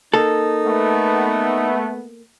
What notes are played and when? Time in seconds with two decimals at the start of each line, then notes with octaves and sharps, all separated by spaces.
0.14 A#3 D#4 A4
0.66 A3 B3